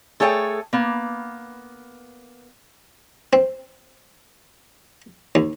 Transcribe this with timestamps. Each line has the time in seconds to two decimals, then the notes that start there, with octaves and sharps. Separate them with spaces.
0.20 A3 G#4 A4 C#5 F#5 G5
0.73 A#3 B3
3.33 C4
5.35 D#2